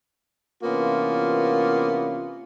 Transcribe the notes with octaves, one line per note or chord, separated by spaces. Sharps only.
C3 E3 A#3 B3 C#4 F4